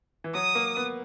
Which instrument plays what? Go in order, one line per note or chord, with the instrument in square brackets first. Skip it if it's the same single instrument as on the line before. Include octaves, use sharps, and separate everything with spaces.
[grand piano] E3
[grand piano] F#3 [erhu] D#6
[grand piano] A#3
B3